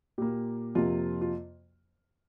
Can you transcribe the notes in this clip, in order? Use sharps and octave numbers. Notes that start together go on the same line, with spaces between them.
A#2 A#3 G4
F2 C3 A#3 F4
F4